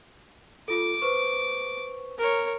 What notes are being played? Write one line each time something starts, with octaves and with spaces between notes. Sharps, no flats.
F4 A4 D6
B4 C5 C#6
A#4 C#5